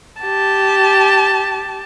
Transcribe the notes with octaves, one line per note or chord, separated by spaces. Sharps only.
G4 A5